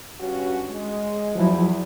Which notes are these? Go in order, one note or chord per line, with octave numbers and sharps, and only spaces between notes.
G2 C#4 F#4
G#3
E2 F3 F#3 E4